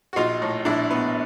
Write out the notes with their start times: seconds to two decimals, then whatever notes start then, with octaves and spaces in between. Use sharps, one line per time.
0.13 F#4
0.16 A#1 D#4 F4
0.42 A2
0.65 A#1 D4 E4
0.91 B3